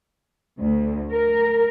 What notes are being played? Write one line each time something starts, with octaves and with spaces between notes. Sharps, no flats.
D2
A#4